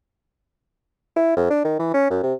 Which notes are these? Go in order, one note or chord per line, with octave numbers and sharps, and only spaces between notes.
E4
F2
D4
D#3
E3
C#4
F#2
C3